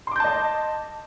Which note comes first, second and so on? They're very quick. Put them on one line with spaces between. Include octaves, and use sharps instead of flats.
C6 D6 G6 A5 D#5